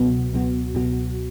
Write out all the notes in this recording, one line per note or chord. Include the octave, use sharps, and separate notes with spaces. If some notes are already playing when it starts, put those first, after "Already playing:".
Already playing: C#2 B2 F#3 B3 F#4
C#2 B2 F#3 B3 F#4
C#2 B2 F#3 B3 F#4